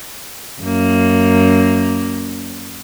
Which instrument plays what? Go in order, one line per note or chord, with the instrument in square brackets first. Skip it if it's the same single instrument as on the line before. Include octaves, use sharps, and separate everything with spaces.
[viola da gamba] F#2 A#3